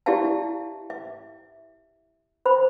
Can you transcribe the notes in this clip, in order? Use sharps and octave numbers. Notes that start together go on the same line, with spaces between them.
E4 G4 D5 E5 F5 A5
E5
C5 B5